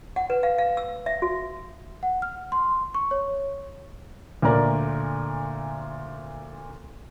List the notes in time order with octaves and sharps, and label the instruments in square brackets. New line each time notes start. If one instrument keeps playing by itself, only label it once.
[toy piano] F#5
B4
F5
F5
E6
E5
F#4
[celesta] F#5
F6
C6
C#6
C#5
[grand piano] D2 A#2 A#4 D5